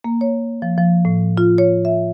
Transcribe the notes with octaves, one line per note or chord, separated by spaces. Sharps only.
A#3
C#5
F3
F3
A2
F4
C#5
E5